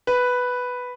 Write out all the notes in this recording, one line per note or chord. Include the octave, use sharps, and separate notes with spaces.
B4